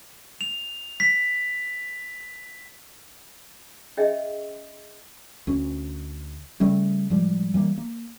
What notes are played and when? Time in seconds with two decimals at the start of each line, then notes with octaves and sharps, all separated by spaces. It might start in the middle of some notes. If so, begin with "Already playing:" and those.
0.41 F7
1.00 B6
3.97 C#4 G#4 D#5 E5 G5
5.47 D2 C#4
6.60 C#3 G3 A3 C#4
7.10 A2 F3 G3 G#3
7.54 E3 G3 A#3
7.78 A#3